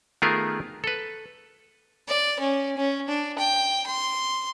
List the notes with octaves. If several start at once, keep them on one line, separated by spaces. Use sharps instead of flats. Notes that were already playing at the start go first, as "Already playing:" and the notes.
D#3 A3 B3 F4 G#4 A#4
A4 B4
D5
C#4
C#4
D4
G5
C6